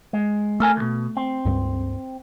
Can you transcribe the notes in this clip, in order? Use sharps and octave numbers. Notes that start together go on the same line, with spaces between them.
G#3
A3 A4 A#4 G#5
D2 B2
C4
C#2 G2